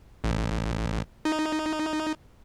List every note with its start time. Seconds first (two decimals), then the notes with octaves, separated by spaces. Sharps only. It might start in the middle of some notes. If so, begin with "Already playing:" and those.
0.24 A1
1.25 D#4